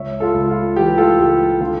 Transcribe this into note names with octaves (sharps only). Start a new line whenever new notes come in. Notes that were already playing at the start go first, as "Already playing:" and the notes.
Already playing: C#2 C#5 E5
F4 A4
C#2
F4
E3 G4
F4 A4
C#2 G4
D3 F4 A4